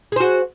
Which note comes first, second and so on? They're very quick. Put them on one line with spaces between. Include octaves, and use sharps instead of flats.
G#4 C5 F#4